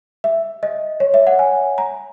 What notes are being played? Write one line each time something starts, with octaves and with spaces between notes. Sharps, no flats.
E5
D#5
C#5
E5
F#5
G#5
A#5